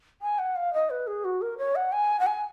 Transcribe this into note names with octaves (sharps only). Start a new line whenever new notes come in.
G#5
F#5
F5
D#5
B4
G#4
F#4
A#4
C#5
F#5
G#5
F#5
G#5